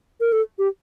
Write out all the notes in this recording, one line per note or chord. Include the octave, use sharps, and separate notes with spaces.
A#4
A4
G4